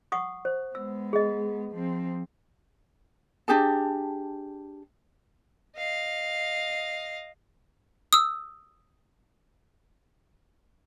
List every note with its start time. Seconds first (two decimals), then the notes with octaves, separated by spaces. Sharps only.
0.12 F#5 C#6 D#6
0.45 C5
0.75 G#3 B3 E6
1.13 G#4 D#5
1.71 F3 C4
3.48 D4 G4 G#4 A5
5.77 D#5 F5
8.13 D#6 E6